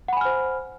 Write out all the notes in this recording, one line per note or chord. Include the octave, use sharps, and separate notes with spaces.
C5 F#5 G#5 B5 F6